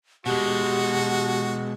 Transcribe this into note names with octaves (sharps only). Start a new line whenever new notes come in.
B2 G#3 F#4 G4